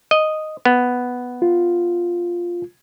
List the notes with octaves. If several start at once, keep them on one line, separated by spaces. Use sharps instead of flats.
D#5
B3
F4